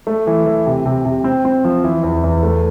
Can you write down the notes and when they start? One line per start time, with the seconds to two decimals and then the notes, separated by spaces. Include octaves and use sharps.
0.07 A3
0.27 E3
0.46 E3
0.66 C3
0.86 C3
1.05 C3
1.24 C4
1.45 C4
1.64 F3
1.84 E3
2.03 E2
2.24 E2
2.43 A3